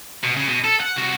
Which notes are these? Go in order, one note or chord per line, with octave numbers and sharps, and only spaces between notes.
B2
C#3
B2
A4
F#5
C2 F#4